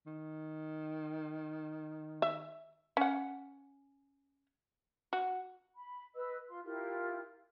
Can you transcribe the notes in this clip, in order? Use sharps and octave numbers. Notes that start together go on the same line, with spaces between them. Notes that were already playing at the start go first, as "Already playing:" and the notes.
D#3
E5
C#4 F#5
F#4
B5
B4 D#5 E6
F4 C6
E4 F4 G4 A#4